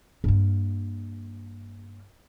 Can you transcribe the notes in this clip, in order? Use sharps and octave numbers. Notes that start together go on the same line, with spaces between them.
G2 A#3